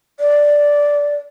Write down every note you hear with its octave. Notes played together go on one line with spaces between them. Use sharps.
D5